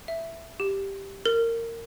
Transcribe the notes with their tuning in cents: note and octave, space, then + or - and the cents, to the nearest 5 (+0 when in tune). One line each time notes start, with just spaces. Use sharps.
E5 +5
G4 +0
A#4 -20